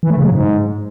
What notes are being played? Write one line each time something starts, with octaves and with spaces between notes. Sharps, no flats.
E3
A3
C#3
F#3
G#2